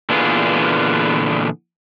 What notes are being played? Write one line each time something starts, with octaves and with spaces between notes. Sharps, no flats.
A#2 D3 E3 B3 F4 G#4